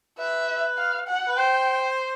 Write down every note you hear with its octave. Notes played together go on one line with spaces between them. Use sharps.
B4 E5
F5
F#5
B4
C5 G5